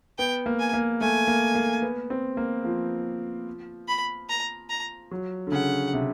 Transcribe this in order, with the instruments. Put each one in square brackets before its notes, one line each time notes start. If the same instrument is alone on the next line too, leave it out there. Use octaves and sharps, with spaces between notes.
[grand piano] B3 [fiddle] G5
[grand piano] A#3
[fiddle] G#5
[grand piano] A#3
[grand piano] A3 [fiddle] G#5
[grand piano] A#3
A#3
B3
C4
A#3
F3
[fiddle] B5
A#5
A#5
[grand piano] F#3
D3
[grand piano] C#3 [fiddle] F#5
[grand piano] C3